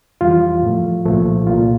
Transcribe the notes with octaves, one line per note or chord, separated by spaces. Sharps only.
F2 E3 G3 F4
A2 F3 A3
C2 A#2 F3 A3
C2 A#2 A3 F4